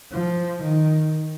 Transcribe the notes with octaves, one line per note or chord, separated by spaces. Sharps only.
F3
D#3